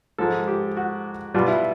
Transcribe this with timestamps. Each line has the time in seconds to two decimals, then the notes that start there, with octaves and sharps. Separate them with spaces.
0.18 G#2 F3 G#3 A4
0.48 G4
0.77 F#4
1.34 B2 G3 F4
1.48 E4